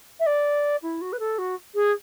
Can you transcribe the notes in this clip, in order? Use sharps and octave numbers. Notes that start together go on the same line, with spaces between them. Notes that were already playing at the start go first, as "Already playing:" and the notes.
E5
D5
E4
F#4
B4
A4
F#4
G#4